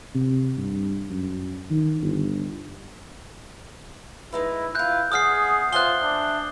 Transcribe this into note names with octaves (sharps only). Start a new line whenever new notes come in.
C3
G2
F#2
D#3
G1
G#3 D#4 E4 B4
E3 E4 F4 F#6 G6
E2 B3 G#4 F#5 D#6 F6 C7
F4 C5 E5 G#5 F#6 G7
D4